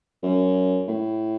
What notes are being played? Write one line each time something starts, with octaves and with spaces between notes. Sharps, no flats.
F#2
A2